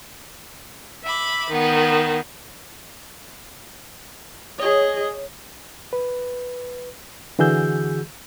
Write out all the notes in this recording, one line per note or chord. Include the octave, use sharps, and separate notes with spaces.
E5 B5 D6
D#3 B3
G#4 C#5 D#5
B4
D3 E3 F#4 G#4 E6 G6